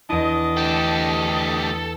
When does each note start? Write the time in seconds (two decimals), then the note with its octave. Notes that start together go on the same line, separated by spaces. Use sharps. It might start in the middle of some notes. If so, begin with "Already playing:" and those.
0.09 E2 D4 E4 D#5
0.57 D2 G4 A4